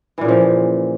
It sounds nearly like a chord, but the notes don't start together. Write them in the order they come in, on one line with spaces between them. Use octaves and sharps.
E3 A#2 C#3 F3